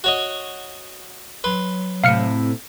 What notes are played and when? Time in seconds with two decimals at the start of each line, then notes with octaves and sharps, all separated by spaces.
0.04 F#4 C#5 D#5
1.44 F#3 B4 C6
2.04 A2 C3 F5 F6 C#7